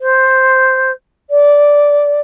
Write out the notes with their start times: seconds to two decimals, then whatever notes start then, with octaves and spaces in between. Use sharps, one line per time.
0.01 C5
1.30 D5